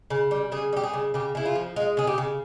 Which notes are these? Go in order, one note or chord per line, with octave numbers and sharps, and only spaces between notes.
C#3
G3
C#3 G#4
G3 G4
G#4
C#3
C#3 G4
C#3 E4
F4
F3
G#3 F4
C#3 G#4
G4
C#3